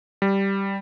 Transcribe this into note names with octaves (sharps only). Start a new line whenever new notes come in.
G3